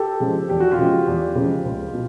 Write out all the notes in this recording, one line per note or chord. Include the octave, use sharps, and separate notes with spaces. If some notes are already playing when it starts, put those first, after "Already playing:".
Already playing: G4 A4
C#3 F3 G#3
E2 G4
F#4
F4 G4
C#3 F3 G#3
E2
C#3 F3 G#3
C#2
B2